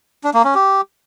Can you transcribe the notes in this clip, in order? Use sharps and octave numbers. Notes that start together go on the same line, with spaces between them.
D4
A#3
C#4
G4